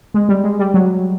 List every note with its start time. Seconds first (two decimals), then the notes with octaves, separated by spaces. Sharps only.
0.14 G#3
0.29 G3
0.44 G#3
0.59 G3
0.74 F#3